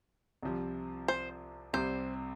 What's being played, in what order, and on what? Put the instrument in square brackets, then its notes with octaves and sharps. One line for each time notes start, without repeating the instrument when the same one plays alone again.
[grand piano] C2 C3 F3
[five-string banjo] C5
[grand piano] C2 C3 G3 [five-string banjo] C5